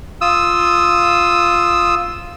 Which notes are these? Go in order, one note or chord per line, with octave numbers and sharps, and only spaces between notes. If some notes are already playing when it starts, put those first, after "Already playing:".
F4 D#6 E6